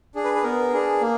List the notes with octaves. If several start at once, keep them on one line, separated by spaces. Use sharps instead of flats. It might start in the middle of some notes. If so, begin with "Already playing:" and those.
D4 G#4
B4
B4
B3 A#4
D4 G#4
A#3